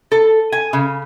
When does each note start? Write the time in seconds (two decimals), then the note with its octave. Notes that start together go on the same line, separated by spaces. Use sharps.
0.12 A4
0.52 G#5
0.73 C#3